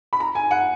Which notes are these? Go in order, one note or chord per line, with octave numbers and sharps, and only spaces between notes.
B5
A#5
G#5
F#5